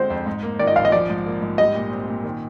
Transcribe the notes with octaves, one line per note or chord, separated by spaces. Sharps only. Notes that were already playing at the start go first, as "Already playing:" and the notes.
Already playing: D3 G#3 C4 C5
F2
G#2
A#3
D#3 D5
D#5
A#1 F5
D#5
F3 D5
G#2
A#3
G#2
G3 D#5
A#2
C4
A#2
D#3